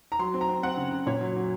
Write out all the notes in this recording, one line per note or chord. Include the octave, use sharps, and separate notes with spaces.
A#5
F#3 C6
C4
A#5
C4
C4 F#5
C#3
C#3
A#2 C#5
F#3
F#3